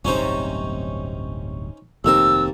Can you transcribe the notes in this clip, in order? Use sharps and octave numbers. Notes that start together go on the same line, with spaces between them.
D1 G1 C3 C#4 D#4 C5
F1 D#2 D#3 C4 A#4 A5 E6